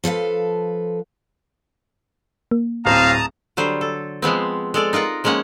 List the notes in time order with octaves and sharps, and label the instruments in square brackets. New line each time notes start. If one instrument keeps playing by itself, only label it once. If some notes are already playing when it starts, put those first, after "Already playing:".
[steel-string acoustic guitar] F3 A4 B4 F5
[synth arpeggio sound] A#3
[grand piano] D1 C4 [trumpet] F5 [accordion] A5 A#5 D#6
[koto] D3 F#3 G3 C5
A4
F3 G#3 B3 C4
G#3 A4 D5
D#4 F4 A#4 F#5
F3 G#3 A#3 C#4 F#5